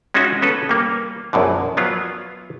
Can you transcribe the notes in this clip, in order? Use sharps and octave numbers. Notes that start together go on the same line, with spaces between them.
G#3 C#4 D#4 F4 F#4 E5
B3 C#4 A4 B4
G3 A#3
A#1 F#2 B2 D3
F3 F#3 B3 F4